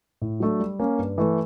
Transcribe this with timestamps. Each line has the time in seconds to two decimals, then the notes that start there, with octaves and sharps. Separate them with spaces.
0.21 A2
0.40 F#3 A3 D4
0.60 G3
0.79 A#3 C#4
0.99 G2
1.18 E3 A3